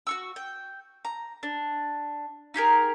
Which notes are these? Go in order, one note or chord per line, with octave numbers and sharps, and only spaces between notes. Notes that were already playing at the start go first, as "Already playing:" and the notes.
F#4 C#6 E6
G5
A#5
D4
D#4 G4 G#4 A#4